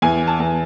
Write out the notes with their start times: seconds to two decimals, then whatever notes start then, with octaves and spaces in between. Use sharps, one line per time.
0.02 E2 G#5
0.27 A5
0.40 E2